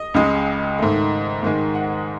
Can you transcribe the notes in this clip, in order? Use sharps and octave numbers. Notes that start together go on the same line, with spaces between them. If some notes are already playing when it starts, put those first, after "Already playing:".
Already playing: D#5
C#2 C#3 G#3
G#2 D#3 A3
G#2 D#3 G#3
F#5